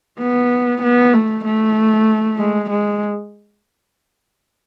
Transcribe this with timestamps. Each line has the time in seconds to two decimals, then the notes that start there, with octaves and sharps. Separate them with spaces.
0.19 B3
0.83 B3
1.14 A3
1.45 A3
2.39 G#3
2.70 G#3